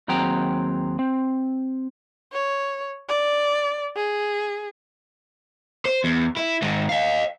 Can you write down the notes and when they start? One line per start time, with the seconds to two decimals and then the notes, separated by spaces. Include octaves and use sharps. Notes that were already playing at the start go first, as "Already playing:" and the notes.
0.08 D#2 F#3 C4 G#4 G5 A#5
0.99 C4
2.32 C#5
3.09 D5
3.96 G#4
5.85 C5
6.04 E2
6.37 E4
6.62 G#2 D#3
6.89 D#5 F5